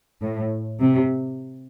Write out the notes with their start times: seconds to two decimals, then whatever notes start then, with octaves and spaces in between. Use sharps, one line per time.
0.20 A2
0.81 C3